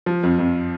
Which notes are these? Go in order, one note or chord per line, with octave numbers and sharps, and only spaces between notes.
F3
F2
F2